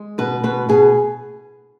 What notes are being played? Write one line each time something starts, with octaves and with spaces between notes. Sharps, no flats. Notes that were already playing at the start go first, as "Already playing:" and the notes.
Already playing: G#3
B2 B4
B2 B4
B2 G#4